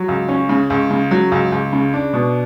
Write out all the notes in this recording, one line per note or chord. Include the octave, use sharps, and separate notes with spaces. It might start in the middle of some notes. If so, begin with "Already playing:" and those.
Already playing: F#3
C#2
C#4
C#3
C#2
C#3
F#3
C#2
C#2
C#3
D4
B2